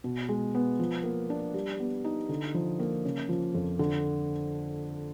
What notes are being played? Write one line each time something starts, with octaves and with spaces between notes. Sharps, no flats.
B2
G#3
B3
F3
A#3
D4
G3
B3
D#4
D3
F3
A#3
C#3
F3
F2
D3